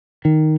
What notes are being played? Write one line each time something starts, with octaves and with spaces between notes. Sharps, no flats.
D#3